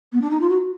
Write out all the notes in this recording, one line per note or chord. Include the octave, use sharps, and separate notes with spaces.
B3
D4
D#4
F4
F#4